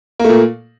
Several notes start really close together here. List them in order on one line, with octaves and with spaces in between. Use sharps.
A#3 A3 A#2